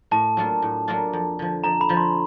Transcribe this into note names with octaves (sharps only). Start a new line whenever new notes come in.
A2 A5
F#3 A#3 D4 F4
A2
F#3 A#3 D4 F4
F2
D3 F3
F2 A#5
B5
D3 F3
C6